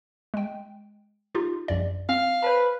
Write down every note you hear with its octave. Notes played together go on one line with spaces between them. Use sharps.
G#3 G5
D#4 F4 G4
A#1 F#2 D5
C4 F5
B4 C5 A5